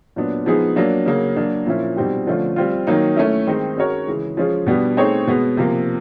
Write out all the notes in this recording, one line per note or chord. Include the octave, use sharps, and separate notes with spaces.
A#2 F#3 B3 D4
F3 G#3 B3 D#4 G#4
F#3 A#3 D4
C#3 F#3 A#3
F#3 A#3 D4
A#2 F3 A#3 C#4 E4
B2 G3 C4 D#4 G4
D3 F3 A3 C#4 F4
G3 C4 F4
D#3 F#3 A#3 D#4
A3 C#4 E4
D#3 G#3 C4 D#4
G#3 C#4 F#4 A#4 C#5
C#3 E3 G#3
F3 G#3 C#4 F4 G#4
B2 G3 B3 D4
A3 C4 D#4 G#4 C#5
B2 G#3 B3
C3 F3 A#3